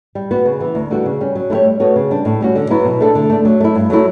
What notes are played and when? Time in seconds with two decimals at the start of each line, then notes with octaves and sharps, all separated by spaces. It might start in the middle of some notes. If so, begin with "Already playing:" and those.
0.15 G3
0.31 B3 F#4
0.45 C#3
0.60 E3 B3
0.75 D2
0.91 D3 G3 B3 F#4
1.05 C#3
1.20 G3 C#4
1.35 F#3
1.50 A3 E4 G4 C#5
1.65 G3
1.80 B3 F#4 A4 C#5
1.96 C#3
2.10 G3 D4
2.25 A2
2.41 G3 C#4 F#4
2.55 D3
2.70 F#3 B3 E4
2.85 B2
3.00 A3 D4 A4
3.15 D3
3.30 A3 D4
3.45 F#3
3.60 A3 E4
3.75 G2
3.90 F#3 A3 E4